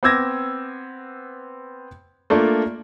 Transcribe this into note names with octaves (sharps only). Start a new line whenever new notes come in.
B3 C4 D6 E6 G#6 A#6
A3 A#3 D4 F4